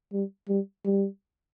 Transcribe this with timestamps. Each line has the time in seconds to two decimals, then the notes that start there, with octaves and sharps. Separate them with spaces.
0.12 G3
0.48 G3
0.85 G3